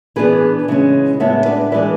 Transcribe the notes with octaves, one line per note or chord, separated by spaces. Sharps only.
E3 B3 D4 G#4 B4
C#3 E3 G#3 C#4
A2 G#3 B3 D4 C#5 E5
B4 D5
E3 G#3 D4 B4 D5